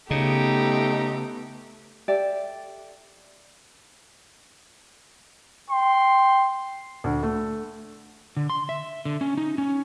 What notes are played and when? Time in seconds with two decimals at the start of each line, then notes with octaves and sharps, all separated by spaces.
0.11 C#3 A3 B3 D#4 G4
2.08 G4 A4 D5 E5
5.70 G5 C6
7.04 D2
7.23 A3
8.37 D3
8.50 C6
8.69 E5
9.05 D3
9.21 C#4
9.37 D#4
9.58 C#4